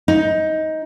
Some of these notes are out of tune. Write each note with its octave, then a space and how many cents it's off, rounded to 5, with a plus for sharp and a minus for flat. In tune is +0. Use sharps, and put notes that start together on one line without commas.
D#4 +15